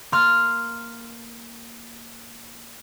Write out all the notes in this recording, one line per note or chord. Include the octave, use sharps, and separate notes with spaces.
A#3 C6 F6